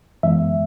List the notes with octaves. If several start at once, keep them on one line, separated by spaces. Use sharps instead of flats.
F#2 E3 G#3 B3 E5